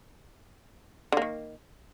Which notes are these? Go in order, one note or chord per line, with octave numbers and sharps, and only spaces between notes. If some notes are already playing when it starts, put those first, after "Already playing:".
D3 D#3 A#3